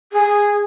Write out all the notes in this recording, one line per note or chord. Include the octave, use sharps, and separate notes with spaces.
G#4